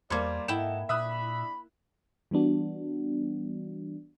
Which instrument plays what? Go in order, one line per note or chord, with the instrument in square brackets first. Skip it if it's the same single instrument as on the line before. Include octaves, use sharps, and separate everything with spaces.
[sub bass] E2 [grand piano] G3 C5 G#6 [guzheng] A#3 A4 [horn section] D5
[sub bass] G#2 [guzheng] E4 G5 [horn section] A4 D#5 F#5 [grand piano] E7
[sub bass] A#2 [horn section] D4 B5 [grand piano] E5 D#6 F#6
[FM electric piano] E3 G3 B3 D4 F#4